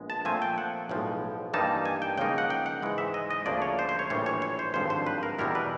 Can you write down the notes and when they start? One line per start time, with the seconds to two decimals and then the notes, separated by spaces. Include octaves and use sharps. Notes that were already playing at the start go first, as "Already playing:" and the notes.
Already playing: A#1 G#3 B3
0.10 A5
0.25 A#2 F3 A3 C4 G#5
0.42 G5
0.58 F#5
0.89 B1 A2 F3 G#3
1.54 G2 E3 G3 A#3 D#4 A5
1.85 G#5
2.02 G5
2.17 C#2 C#3 F3 A#3 D#4 G5
2.38 F#5
2.50 G5
2.66 F#5
2.82 G#2 E3 G#3
2.98 E5
3.14 D#5
3.31 D#5
3.46 D2 C#3 F3 A#3 D4 D5
3.62 C#5
3.79 C5
3.89 C5
3.99 C#5
4.10 A#1 A2 E3 G3 C#5
4.26 C#5
4.42 C#5
4.59 C5
4.74 G#1 G2 D3 F3 C5
4.90 C5
5.07 B4
5.23 A#4
5.39 E2 B2 G3 C4 E4 A#4
5.55 B4